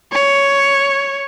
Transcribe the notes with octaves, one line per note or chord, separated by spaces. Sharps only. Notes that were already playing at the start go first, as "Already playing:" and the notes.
C#5